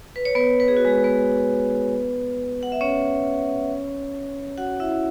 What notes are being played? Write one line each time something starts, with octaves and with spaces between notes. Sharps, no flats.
B4
C#5
B3 B4
B4
G#4
F#4
G#3 G#4
B3 B4
F#5
E5
C#4 C#5
F#4 F#5
E4 E5